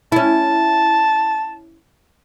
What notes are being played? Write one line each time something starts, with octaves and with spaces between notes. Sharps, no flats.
C#4 E4 A5